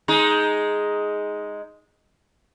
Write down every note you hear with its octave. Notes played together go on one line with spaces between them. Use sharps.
G#3 D#4